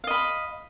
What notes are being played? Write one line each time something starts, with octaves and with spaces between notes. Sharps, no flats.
D#5 F5 B5